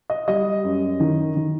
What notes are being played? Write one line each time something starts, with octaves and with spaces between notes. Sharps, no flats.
D#5
G3 D#5
F#2
D#3
D#3